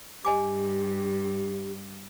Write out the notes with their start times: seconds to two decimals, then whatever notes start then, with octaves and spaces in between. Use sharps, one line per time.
0.25 G2 G4 D#5 G#5 D6